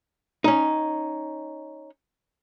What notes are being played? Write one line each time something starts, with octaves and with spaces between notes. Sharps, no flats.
C#4 D#4